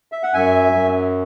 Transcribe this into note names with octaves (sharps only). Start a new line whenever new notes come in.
E5
F#5
F#2 E5 G#5
F#2